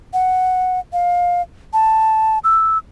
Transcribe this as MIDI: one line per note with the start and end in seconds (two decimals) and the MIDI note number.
0.13 0.80 78
0.93 1.42 77
1.73 2.39 81
2.44 2.78 88